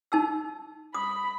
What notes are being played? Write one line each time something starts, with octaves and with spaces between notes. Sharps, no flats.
D#4 A5 E6
B5 D#6